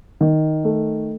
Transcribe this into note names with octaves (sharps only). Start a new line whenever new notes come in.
D#3
A3